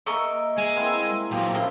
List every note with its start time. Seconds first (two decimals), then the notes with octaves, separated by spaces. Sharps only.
0.06 A#3 A#4 D#5 E5 C#6
0.58 G#3 G#5
0.75 A#3 C4 E4
1.31 A#2 F3 F#3 A#3 G4 G#4
1.55 F#2 E4 D#5 F5